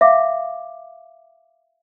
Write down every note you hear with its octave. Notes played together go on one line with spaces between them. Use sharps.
E5 F5 D6